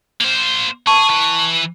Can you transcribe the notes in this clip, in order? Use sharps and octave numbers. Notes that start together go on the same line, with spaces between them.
A#3 C5
G#4 A5 C#6
E3 B4